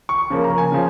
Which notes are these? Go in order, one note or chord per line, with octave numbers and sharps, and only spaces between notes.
C#6
C#3 F3 A#3
A#5
G#5
C#3 F3